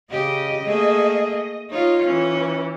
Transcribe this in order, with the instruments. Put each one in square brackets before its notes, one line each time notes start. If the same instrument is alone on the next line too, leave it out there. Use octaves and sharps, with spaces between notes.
[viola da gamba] C#3 G4 [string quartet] D#5
[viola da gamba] A3 A#3 G#4
[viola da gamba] D#4 F4 [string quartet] C#5
[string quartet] E3 [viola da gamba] C#4